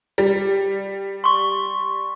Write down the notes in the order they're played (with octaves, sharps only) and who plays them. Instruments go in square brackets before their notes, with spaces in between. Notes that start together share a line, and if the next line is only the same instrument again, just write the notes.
[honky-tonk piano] G3
[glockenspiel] C6 C#6